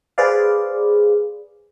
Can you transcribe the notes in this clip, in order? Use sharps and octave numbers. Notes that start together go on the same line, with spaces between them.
G#4 B4 C5 D5 F5